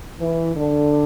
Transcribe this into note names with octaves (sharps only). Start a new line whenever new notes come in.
E3
D3